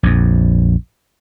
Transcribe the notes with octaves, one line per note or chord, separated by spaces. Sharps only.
A#1 F2